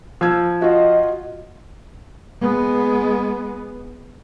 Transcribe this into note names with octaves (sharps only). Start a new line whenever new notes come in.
F3 E6 G#6
F4 F#4 D#5
G#3 B3